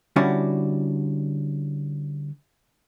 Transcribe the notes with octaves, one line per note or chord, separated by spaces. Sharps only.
D3 G3 C#4 E4 F#4 D5